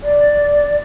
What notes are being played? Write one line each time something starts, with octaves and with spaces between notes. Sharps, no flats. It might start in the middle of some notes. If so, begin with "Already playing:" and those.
D5